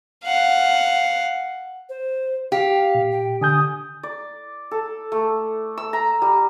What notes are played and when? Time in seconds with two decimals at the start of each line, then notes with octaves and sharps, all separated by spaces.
0.24 F5 F#5
1.89 C5
2.52 G4 F5
2.95 A#2
3.12 G5
3.41 D3 G#5 D#6 G6
4.03 D5
4.71 A4
5.12 A3
5.78 E6
5.93 A#5
6.22 G3